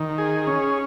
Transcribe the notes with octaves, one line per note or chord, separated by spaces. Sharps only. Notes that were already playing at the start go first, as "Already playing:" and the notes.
Already playing: D#3
G#4
C#4